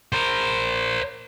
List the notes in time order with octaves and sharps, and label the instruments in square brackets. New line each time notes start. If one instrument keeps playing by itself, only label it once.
[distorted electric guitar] A#4 C5